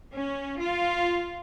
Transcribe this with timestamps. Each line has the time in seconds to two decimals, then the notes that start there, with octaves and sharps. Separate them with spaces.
0.14 C#4
0.60 F4